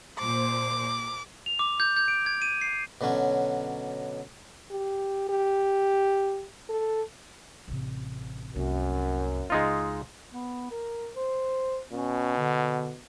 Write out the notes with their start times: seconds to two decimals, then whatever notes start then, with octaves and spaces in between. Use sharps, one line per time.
0.19 A#2 C5 D6
1.46 F7
1.59 D6
1.80 G6
1.97 G6
2.08 D7
2.26 G#6
2.42 D#7
2.61 C7
3.01 B2 D3 F#3 C#4
4.71 G4
5.29 G4
6.69 A4
7.68 A1 C3
8.55 C2 F#2 A#3
9.50 C#2 G#3 D#4 F4
10.32 B3
10.71 A#4
11.16 C5
11.92 B2 C#4
12.37 D3